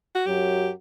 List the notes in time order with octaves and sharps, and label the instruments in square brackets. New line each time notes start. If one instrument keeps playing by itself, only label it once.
[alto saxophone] F#4
[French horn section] F#2 F#3 [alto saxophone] G4